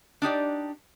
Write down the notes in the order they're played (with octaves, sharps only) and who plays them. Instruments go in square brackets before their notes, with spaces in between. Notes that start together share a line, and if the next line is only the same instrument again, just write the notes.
[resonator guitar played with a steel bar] D4 D#4 G4 D5